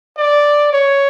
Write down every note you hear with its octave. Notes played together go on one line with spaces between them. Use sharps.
D5
C#5